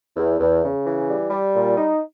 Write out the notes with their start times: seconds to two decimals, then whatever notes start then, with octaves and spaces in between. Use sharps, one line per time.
0.17 E2
0.39 E2
0.62 C#3
0.84 E3
1.07 G3
1.29 G3
1.53 A#2
1.75 D#4